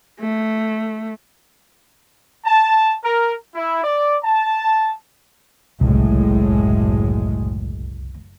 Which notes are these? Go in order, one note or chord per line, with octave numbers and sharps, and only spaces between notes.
A3
A5
A#4
E4
D5
A5
F#1 C2 A2 G#3